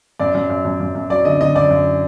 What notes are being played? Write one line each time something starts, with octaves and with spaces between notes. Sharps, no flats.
F#2 D5
F#2
F#2
F#2
F#2
F#2
F#3 D5
D3 D#5
D3 D#5
F#2 D5
F#2